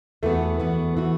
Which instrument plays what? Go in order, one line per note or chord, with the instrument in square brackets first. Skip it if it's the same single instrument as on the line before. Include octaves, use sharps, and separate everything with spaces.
[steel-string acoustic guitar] E2 E3 B3 F#4 [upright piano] A3
[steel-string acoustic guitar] E2 E3 B3 F#4
E3 B3 F#4